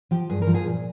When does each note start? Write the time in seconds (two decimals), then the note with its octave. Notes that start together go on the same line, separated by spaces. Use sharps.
0.11 F3 G4
0.30 G2 G#4
0.42 A#4
0.47 F3
0.55 G#4
0.65 A#2